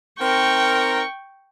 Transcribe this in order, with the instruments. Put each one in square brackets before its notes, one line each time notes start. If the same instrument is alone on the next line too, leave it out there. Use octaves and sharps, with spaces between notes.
[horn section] C4 D#4 A#4 [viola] G5 C#6